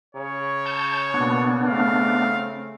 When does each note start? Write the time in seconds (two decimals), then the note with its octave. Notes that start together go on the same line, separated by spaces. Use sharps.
0.15 C#3 C#5
0.66 A5 G6
1.14 B2 A#3 B3 D4
1.66 A3 C4 F5